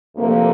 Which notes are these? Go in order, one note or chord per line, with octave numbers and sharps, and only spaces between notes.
D2 C3 F3 A#3